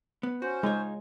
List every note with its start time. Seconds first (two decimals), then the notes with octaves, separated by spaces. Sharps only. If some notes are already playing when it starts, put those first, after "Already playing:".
0.23 B3
0.42 C#4 F#4 C5
0.63 G#3 D#4 F4 C#5